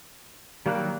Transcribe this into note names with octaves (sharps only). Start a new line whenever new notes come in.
D#3 F#3 G3 A#3 F#6